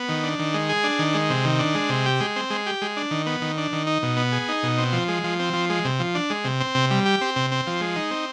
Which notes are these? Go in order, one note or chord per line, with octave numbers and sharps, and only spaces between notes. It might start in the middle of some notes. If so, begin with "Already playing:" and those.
Already playing: B3
D#3
D4
D#3
G#3
G#4
D4
D#3
G#3
C3
D#3
D4
G#3
C3
G4
G#3
C4
G#3
G4
G#3
D4
D#3
B3
D#3
D4
D#3
D#4
B2
B3
G#4
D#4
B2
C4
F3
G#3
F3
C4
F3
G#3
C3
F3
D4
G#3
C3
C4
C3
G3
G4
C4
C3
C4
F3
G#3
D#4
C4